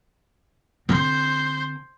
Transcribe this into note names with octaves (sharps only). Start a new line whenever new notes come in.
D3 C4 C5